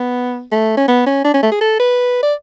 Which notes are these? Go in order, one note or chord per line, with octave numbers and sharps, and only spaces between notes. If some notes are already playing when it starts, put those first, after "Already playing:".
Already playing: B3
A3
C#4
B3
C#4
D4
C#4
A3
G#4
A4
B4
D5